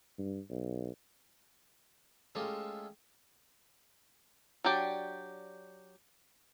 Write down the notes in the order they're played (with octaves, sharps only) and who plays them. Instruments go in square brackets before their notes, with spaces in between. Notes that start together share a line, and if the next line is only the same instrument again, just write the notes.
[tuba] G2
B1
[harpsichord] G#3 A3 C#4 F4 G4 A4
[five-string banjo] F#3 D4 G4 D5